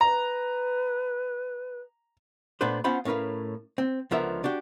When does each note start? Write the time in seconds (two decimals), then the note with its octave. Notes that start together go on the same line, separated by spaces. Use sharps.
0.01 B4 A#5
2.61 A#2 A3 B3 D4 B4 C5
2.84 B3 C#4 F4 C5 F#5 B5
3.05 A2 C#4 A#4 B4 F5
3.78 C4
4.11 C#2 D3 F3 B3 A#4 E5
4.44 D4 F#4 G4